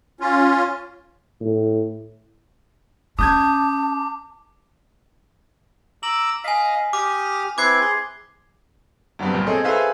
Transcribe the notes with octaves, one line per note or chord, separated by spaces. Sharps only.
C#4 F4
A2
C#4 A5 D6 D#6 G6 G#6
A#5 D6 E6 F#7
D#5 F5 G#5 B6
G4 D6 D#6 F6
C4 E4 B4 D6 G#6 C7
G#4 C6
G2 F#3 G3 B3 C4
C2 A#2
C4 G#4 A4 C#5 D#5
G#4 A4 B4 C5 E5 F5